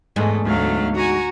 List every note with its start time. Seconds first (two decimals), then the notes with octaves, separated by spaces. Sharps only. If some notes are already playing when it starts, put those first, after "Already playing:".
0.16 E2 G#2 G#3 A3 B3
0.45 D2 F#3 A3 F5
0.96 F#4 G#5 A#5